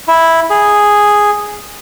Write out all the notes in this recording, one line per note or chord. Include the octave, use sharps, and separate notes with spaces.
E4
G#4